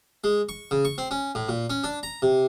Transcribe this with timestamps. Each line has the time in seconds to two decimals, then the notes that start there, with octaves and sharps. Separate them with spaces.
0.24 G#3
0.49 C#6
0.71 C#3
0.85 C#6
0.98 C4
1.11 C#4
1.35 A2
1.49 A#2
1.70 C#4
1.84 D4
2.03 A#5
2.22 C3